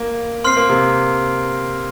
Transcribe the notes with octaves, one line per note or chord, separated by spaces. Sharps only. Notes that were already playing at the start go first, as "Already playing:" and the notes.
Already playing: A#3
C4 C6 F6 C7
A#3
C3 C4